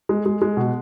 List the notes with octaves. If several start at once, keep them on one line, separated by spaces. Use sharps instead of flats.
G#3
G#3
G#3
B2